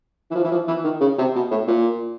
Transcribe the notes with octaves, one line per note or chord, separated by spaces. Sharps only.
E3
F3
E3
F3
E3
D#3
C#3
C3
B2
A2
A#2